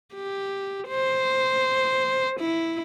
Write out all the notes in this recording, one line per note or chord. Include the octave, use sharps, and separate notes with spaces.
G4
C5
E4